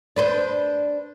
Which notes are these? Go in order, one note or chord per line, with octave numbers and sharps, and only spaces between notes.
D4 B4 C5